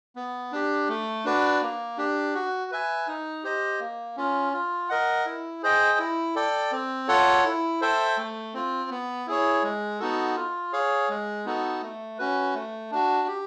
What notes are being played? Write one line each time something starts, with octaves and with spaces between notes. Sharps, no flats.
B3
D4 G4
A3
D4 F#4 B4 D5
A#3
D4 G4
F#4
B4 E5 G#5
D#4
G4 C5 D#5
A#3
C#4 F4
F4
A#4 D#5 F#5
E4
G#4 C5 D#5 G5
E4
A4 D5 G5
C4
F4 A4 C#5 F#5
E4
A4 C5 E5 G5
A3
C4 F4
B3
E4 G#4 C#5
G#3
B3 D#4 F#4 A4
F4
G#4 C#5 F5
G#3
B3 D#4 F#4 A4
A3
C#4 F#4 B4
A3
D4 F#4
G4